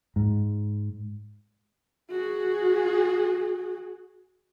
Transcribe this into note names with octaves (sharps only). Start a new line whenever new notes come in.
G#2
F#4 G#4